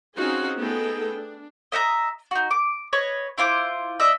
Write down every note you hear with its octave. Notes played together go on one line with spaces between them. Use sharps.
C4 C#4 D#4 F4 F#4 G#4
A3 B3 D#4 G#4 A4 G5
D4
D#5 E5 F#5 A#5
D#4 F#4
D6
B4 C#5 D#5
E4 F4 C5 D6
D4 D#5 E5